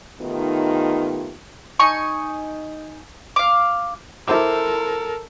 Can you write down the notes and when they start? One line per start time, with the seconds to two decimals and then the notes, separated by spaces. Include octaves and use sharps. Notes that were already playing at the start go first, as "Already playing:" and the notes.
0.21 D#3 A3 B3 D#4 F4 G4
1.80 D#4 G#5 C#6
3.36 F5 D6
4.28 E4 A4 A#4 C5 D6